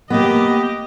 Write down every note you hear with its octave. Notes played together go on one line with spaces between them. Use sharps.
A#3 B3 G4 D#5